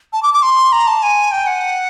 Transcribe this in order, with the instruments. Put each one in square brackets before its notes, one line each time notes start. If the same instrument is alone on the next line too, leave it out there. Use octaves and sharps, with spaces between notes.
[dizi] A5
D6
D6
C6
A#5
A5
G#5
G5
F#5